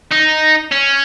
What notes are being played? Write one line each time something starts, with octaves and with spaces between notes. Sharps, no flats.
D#4
C#4